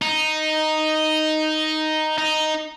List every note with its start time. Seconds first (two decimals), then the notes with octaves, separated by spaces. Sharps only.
0.02 D#4
2.18 D#4